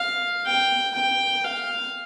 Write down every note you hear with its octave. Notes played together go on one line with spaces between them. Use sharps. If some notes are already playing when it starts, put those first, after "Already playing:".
Already playing: F5
G5
G5
F5